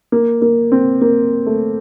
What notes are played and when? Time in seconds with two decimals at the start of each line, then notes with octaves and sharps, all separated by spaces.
0.12 A#3
0.42 A#3
0.72 C4
1.01 A#3
1.46 A3